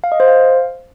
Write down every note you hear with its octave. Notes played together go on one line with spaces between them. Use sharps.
F5
D#5
C5
F5